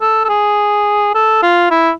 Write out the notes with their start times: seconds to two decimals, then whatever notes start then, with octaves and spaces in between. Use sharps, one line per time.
0.01 A4
0.24 A4
0.29 G#4
1.15 A4
1.43 F4
1.71 E4